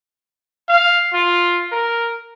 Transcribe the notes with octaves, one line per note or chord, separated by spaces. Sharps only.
F5
F4
A#4